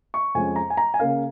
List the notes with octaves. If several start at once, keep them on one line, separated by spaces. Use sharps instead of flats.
C#6
F2 F3 G#3 C#4 G#5
A#5
G#5
A#5
G#5
C#3 A#3 C#4 F5